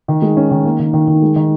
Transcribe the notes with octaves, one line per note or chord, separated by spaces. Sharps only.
D#3
G#3
C#4
D#3
A#3
D#3
D#3
D#3
G#3
D#3